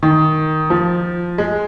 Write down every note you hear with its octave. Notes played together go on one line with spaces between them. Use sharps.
D#3
F3
G#3